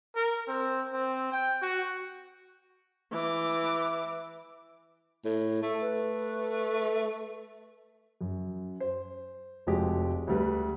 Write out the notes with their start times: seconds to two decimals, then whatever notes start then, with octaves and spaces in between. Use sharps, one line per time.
0.16 A#4
0.48 C4
0.93 C4
1.32 G5
1.62 F#4
3.12 E3 D6
5.25 A2
5.62 A3 A4
5.81 B4
8.21 F#2
8.80 C5
9.67 F1 F3 G#3 F#4 G4
10.27 D2 G3 B4